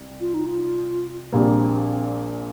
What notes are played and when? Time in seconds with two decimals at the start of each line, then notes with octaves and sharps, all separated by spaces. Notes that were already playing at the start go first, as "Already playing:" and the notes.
Already playing: C2
0.21 F4
0.34 D#4
0.46 F4
1.32 A#1 A#2 G3 A#3 C4